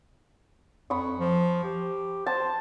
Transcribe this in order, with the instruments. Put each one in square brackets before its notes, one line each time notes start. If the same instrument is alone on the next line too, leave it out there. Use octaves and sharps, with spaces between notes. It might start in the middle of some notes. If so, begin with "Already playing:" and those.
[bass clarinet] F2 [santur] B5 C#6 D#6
[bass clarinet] F3
G4
[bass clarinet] C5 [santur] A5